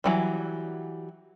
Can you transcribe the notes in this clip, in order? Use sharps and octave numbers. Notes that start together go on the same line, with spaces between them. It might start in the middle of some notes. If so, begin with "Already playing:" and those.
E3 F#3 G3